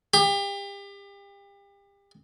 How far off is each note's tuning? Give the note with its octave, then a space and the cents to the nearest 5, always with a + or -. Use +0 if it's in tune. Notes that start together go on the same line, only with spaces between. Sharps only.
G4 +35